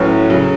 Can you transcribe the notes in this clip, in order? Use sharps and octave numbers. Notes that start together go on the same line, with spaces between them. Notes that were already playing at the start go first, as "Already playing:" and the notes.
Already playing: A2 F#3 C#4 F#4 B4
C#3 F#3